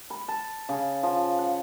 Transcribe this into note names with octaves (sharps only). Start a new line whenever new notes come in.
B5
A5
C#3
F3
F#5